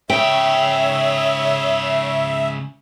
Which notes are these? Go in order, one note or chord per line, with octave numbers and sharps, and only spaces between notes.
G#2 C#3 C#5 E5 G5